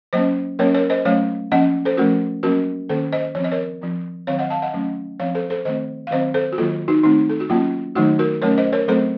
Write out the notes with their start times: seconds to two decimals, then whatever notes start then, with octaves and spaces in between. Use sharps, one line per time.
0.13 F#3 A#3 C#4 C5 D#5
0.59 F#3 A#3 C#4 A#4 C#5
0.74 A#4 C#5
0.90 C5 D#5
1.05 F#3 A3 C#4 C#5 F5
1.52 F3 A#3 C#4 D#5 F#5
1.85 A4 C5
1.97 F3 A3 C#4 F#4 A#4
2.43 F#3 A#3 C#4 F#4 A#4
2.89 D#3 A#3 C#4 A4 C5
3.13 C5 D#5
3.35 F3 C4 C#5
3.44 D#5
3.52 A#4 C#5
3.82 F3 C4
4.27 D#3 F#3 C4 C#5 F5
4.39 D#5 F#5
4.50 F5 A5
4.62 D#5 F#5
4.74 F#3 A3 C#4
5.20 F3 C4 C#5 F5
5.35 A4 C5
5.50 A4 C5
5.65 D#3 A3 C4 C5 D#5
6.07 F5
6.11 D#3 F#3 C4 C5 D#5
6.34 A4 C5
6.52 F#4
6.58 D#3 F#3 A#3 F4 A4
6.88 D#4 F#4
7.03 D#3 A3 C4 D#4
7.29 A4
7.40 F#4
7.50 F#3 A#3 C#4 F4
7.95 D#3 F#3 A3 D#4 F#4
8.19 F#4 A#4
8.42 F#3 A3 C#4 A#4 C#5
8.58 C5 D#5
8.73 A#4 C#5
8.88 F#3 A3 C4 A4 C5